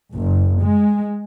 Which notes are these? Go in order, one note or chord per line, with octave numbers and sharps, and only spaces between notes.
F#1
G#3